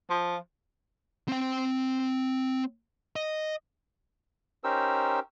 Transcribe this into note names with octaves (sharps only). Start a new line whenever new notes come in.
F3
C4 G5
D#5
C#4 D#4 G4 A#4 C5 E6